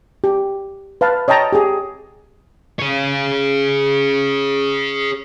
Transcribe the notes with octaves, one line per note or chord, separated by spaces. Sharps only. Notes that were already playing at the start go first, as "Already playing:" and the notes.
G4
B4 F5 A5
C#5 D#5 G5 A5 A#5
G4 G#4
G#4 C#5